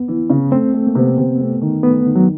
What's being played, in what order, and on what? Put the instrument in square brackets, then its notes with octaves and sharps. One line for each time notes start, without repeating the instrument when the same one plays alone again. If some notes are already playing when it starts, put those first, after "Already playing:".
Already playing: [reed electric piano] B3
[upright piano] E3
C#3
[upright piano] A3 [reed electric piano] C4
[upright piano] A3
[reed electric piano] A#3
[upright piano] C3 [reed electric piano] B3
[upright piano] C3
A3
D#3
[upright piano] A3 [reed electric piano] B3
[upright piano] D#3
[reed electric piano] F#3